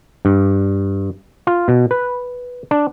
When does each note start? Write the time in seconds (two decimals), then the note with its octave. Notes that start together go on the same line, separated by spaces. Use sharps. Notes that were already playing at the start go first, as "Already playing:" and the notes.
0.25 G2
1.47 F4
1.68 B2
1.91 B4
2.71 D4